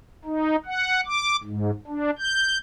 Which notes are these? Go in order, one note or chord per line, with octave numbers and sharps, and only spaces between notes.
D#4
F#5
D6
G#2
D4
G6